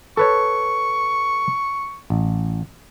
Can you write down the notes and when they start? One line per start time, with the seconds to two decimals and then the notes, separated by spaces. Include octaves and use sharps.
0.17 A4 B4 C#5 C#6
2.10 A1